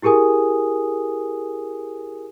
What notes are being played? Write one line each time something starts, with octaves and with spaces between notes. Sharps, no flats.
E4 G4 G#4 A#4 G#5 D#6